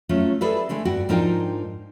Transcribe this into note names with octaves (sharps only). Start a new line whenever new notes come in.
F#3 A3 C#4 F4 C#5
G#4 A4 B4 D5 E5
D3 G#3 A3 D4
G2 F#4 G5
G#2 F3 D4 D#4 A#4 G5